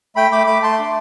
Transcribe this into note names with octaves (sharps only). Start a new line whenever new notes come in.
A3 G5 B5
A3 B5 D6
A3 B5 D6
A3 A5 C6
D4